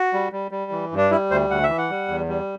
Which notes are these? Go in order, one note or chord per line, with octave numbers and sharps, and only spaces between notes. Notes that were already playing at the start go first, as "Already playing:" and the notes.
Already playing: F#4
G3
G3
G3
E3
G2
D4
G3 E4
D2 C5
D2 F#5
E5
E3
F#5
G3
E2
G3